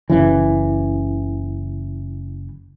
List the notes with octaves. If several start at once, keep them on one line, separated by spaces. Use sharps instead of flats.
F#1 C#3 E3